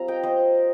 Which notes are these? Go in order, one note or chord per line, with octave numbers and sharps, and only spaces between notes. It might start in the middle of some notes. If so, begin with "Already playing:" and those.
Already playing: G3 C4 F4 A#5
D#5 G5
C5 D#5